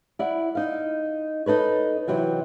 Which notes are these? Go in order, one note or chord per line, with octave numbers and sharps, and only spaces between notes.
E4 D5 F#5
D#4 F5
D#4 A4 B4 C#5
C3 E3 F#3 G5